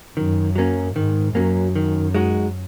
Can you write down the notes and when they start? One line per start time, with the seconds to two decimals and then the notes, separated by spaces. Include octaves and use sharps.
0.16 F#2 D#3
0.55 F#3 A#3 C#4
0.96 G#2 D#3
1.35 F#2 F#3 A#3 C#4
1.76 D#3
2.14 G#3 D#4 F#4